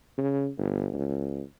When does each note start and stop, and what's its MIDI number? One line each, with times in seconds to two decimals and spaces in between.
0.18 0.49 49
0.58 0.89 31
0.94 1.42 37